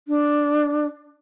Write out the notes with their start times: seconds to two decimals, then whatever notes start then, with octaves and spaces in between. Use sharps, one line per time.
0.08 D4